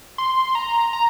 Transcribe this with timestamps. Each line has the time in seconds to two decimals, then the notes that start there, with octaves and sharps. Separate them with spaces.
0.18 C6
0.55 A#5
0.93 A#5